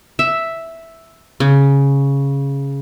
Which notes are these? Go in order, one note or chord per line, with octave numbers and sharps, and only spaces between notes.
E5
C#3